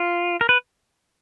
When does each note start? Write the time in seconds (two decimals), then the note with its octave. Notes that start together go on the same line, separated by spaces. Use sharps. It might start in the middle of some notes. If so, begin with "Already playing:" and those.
Already playing: F4
0.41 A#4
0.49 B4